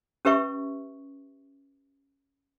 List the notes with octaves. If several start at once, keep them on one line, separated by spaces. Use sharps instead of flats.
C#4 G4 B4 E5 C#6